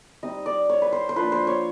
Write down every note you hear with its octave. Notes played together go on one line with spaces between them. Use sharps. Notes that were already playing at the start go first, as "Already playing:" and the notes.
G3 C4 D#4 D#5
D5
C#5
B4
C5
C5
F3 A#3 D4 B4
C5
C#5